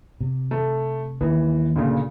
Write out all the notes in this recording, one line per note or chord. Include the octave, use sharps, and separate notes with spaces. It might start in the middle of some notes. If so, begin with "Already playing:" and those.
C3
A3
D#2 E3
D2 A#2 C#3